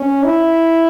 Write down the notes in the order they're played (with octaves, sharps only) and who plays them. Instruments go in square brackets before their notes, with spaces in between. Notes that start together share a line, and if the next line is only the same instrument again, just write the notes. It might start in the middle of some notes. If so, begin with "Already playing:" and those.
Already playing: [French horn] C#4
E4